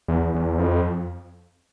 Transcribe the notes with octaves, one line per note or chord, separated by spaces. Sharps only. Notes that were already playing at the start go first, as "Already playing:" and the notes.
E2
E2
F2